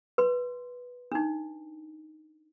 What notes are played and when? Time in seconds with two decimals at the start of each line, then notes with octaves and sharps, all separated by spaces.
0.18 B4 C6
1.12 D4 D#4